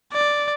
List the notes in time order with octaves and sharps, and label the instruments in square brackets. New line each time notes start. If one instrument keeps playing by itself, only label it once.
[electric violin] D5